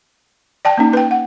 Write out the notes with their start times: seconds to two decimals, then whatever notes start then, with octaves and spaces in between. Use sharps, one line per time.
0.65 D5 G5 A5
0.78 A#3 C#4 D#4
0.93 B4 G5
1.11 F#5